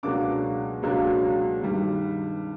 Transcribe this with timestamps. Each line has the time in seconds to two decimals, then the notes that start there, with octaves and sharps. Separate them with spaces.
0.03 C#2 B2 F#3 A#3 D4 D6
0.83 C#2 B2 F#3 A#3 D4
1.62 G2 D#3 G3